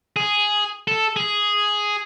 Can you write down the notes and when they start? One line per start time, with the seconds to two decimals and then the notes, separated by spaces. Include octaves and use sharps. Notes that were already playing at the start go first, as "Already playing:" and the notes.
0.16 G#4
0.87 A4
1.16 G#4